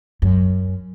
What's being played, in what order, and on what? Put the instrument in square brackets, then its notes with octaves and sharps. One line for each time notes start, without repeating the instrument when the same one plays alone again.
[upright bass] F#2